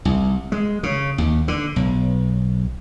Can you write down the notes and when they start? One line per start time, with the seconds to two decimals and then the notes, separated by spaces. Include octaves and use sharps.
0.05 C2
0.52 G#3
0.83 C#3
1.18 D#2
1.48 D3
1.76 B1